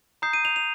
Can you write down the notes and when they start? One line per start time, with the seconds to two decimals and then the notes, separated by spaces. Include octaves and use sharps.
0.22 A#5 D#6 G6 C7
0.33 D#7
0.45 F7
0.56 F7